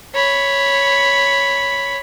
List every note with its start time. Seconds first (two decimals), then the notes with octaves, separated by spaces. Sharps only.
0.15 C#5 B5